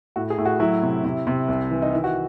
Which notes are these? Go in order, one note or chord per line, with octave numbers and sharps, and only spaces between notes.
A2 F#4
G#4
A2
F#4
F#3 E4
C3
C3 E4
C3
C2
E3
D#4
D#3 E4
F#4